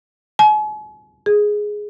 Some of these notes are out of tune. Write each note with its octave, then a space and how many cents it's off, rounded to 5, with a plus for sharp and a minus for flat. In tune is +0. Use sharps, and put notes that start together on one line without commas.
G#5 +40
G#4 +5